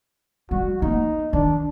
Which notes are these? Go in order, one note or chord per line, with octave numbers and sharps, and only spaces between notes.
G3 F#4
A#3 D#4
D#3 D4